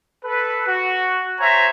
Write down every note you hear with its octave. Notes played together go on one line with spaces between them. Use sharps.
A4 B4
F#4
C5 C#5 E5 G#5 A#5